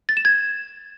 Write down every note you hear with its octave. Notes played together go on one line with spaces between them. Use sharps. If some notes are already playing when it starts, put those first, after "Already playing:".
A6
E7
G#6